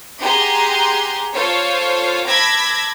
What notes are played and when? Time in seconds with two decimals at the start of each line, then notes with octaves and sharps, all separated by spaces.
0.20 G4 G#4 F#5 G#5 A#5 C6
1.35 F4 A4 C5 C#5 F5
2.26 A5 B5 D6 E6 G#6 A#6